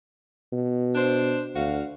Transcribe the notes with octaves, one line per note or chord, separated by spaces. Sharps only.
B2
D4 C5
D2 F#4 F5